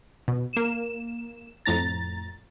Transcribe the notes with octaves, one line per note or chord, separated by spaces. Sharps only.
B2
A#3 E7
F2 A2 A#5 A6